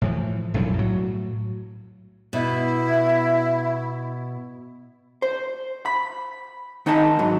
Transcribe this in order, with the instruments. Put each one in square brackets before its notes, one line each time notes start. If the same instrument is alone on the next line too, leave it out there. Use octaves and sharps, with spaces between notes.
[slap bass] A2 E3 F3
B1 F#2 A2 G3
A2 F#3
[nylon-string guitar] B2 [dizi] E4
[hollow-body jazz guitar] C5
B5
D#3 D#4 D#5 G#5 A5 B5
G#2 F#3